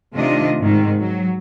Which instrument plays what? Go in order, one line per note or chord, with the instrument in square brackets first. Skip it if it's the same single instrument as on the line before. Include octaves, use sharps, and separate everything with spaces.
[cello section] C3 D#3 A3 D4 F4 D#5
G#2 D#3
F#3